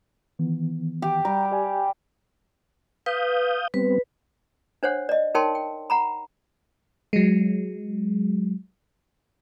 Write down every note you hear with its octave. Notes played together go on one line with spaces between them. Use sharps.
D#3 E3 B3
G4
G3 A#5
G4 D5 G#5
B4 F5 D#6 G6
G3 B3 C4 B4
D4 C5 C#5 F#5
D5 D#5
D#4 A#4 C#5 G5 A5 C6
G5
F#5 A#5 B5
F#3 G#3